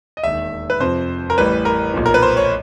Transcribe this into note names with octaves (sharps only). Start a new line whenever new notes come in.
D#5
E1 D#2 D#3 E5
B4
F2 C3 F3 C5
A#4
A1 A2 E3 G3 B4
A#4
B1 A#2 F3
A#4
B4
C5
C#5